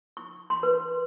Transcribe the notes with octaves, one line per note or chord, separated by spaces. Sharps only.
C#6
C6
B4